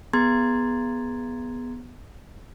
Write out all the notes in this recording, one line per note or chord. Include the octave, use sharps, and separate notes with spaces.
B3 G#4 A#5 C6 G#6 A6